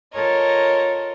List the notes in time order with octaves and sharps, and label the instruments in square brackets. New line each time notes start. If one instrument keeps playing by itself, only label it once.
[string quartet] F4 A4 A#4 C#5 D#5